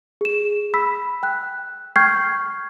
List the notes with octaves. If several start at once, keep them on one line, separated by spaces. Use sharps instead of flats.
G#4 E7
B5 E6 B6
G5 F#6
G5 C#6 F6 G6 G#6 C7